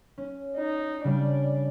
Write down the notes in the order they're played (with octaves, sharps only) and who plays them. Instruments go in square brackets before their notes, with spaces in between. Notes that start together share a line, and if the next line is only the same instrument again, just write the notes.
[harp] C#4
[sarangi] D#4
[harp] C#3 G3 A3 [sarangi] D4